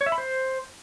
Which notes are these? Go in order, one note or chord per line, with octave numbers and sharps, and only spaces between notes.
C#5
E5
B5
C5